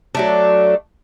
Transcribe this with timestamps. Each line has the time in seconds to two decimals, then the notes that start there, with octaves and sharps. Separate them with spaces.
0.15 F#3 A3 D4